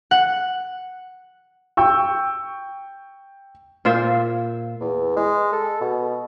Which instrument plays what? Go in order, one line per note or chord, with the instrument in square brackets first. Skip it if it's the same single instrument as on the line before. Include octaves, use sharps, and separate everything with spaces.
[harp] F#5
[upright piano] G5 C#6 E6
[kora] A#2 F4 C5 E5
[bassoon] E2
G#3
A4
B2